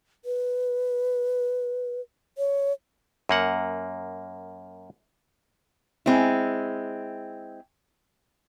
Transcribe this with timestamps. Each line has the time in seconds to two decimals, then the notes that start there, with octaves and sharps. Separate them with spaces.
0.25 B4
2.38 C#5
3.29 F#2 A#3 F#5
6.06 G#3 C4 E4